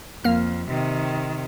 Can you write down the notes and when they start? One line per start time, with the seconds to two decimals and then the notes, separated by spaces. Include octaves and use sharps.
0.24 F2 A#3 F6
0.69 C3 D#3